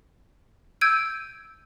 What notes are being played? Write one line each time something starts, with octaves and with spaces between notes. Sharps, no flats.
E6 G6 G#6 D7 D#7